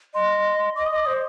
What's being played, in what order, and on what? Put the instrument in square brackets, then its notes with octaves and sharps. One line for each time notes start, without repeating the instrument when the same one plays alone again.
[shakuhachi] D#5 [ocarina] C6
[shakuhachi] D#5 [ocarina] D6
[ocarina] D#6
[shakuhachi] D#5 [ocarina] D6
[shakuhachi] C5 [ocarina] D#6